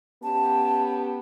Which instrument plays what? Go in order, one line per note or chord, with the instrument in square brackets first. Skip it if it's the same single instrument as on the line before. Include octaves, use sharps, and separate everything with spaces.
[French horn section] B3 C#4 G4 [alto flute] A5